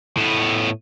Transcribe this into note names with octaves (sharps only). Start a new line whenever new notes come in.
A2 B3